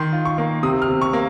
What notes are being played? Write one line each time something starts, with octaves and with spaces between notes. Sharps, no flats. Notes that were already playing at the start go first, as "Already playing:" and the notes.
Already playing: D#3 C6
F4
C#6
A#3
C3 D#6
F6
C3
C#6
A#3